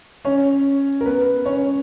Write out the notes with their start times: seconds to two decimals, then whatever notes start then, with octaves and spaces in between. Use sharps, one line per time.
0.25 C#4 C#5
1.01 A#4
1.05 B3 B4
1.46 C#4 C#5